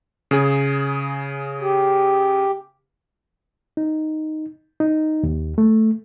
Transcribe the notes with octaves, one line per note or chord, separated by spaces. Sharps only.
C#3 G#4
G4
D#4
D#4
D#2
A3